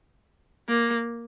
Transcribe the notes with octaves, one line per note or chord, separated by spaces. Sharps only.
A#3